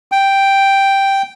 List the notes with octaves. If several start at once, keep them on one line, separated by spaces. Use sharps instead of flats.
G5